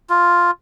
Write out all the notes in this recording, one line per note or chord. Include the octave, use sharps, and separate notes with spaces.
F4